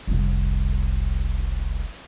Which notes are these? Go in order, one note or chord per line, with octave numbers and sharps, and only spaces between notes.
F1 C2